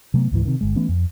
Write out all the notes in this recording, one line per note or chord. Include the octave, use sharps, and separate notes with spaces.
C3 F#3 A3 B3
C#2 G#2 E3
C3 D#3
G1 G#3
E3 A3 B3 C#4
F2